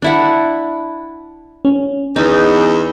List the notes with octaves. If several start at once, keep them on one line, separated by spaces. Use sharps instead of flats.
D4 E4 F#5
C#4
E2 D#4